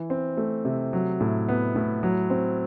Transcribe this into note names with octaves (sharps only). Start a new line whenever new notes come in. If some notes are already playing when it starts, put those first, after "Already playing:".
Already playing: E3
C4
A3
C3
F#3
A2
B3
A2
F#3
C4